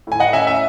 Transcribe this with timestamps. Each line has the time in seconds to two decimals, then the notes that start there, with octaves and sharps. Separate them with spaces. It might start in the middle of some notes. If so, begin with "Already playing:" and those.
0.07 A2 G#5
0.20 D#5 F#5
0.33 C#4 E5 G#5
0.47 E5